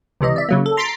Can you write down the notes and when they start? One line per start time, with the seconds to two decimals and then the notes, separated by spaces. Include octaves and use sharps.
0.21 C#2 C3 E3 D#5
0.36 D5 E5
0.49 C#3 F#3 A#3
0.66 A4
0.77 A#5 C6 A6 B6 C7 D7